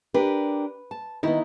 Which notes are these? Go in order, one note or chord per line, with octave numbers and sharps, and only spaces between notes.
D4 G4 A#4 B4
A5
D#3 B3 D#4 E4